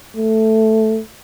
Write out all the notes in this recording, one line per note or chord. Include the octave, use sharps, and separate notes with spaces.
A3